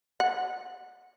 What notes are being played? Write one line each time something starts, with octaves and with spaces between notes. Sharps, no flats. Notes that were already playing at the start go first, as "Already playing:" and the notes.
F#5